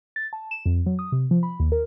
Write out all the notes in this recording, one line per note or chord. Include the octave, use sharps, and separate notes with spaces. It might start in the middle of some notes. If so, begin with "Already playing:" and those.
A6
A5
E7
F2
F#3
D#6
C3
F3
B5
D#2
A#4